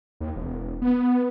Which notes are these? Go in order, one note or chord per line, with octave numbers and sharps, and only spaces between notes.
D#2
E1
B3